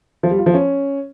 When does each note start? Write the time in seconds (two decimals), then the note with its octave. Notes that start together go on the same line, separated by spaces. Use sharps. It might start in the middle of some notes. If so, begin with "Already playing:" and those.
0.23 F3
0.31 G3
0.39 F4
0.46 F3
0.54 C#4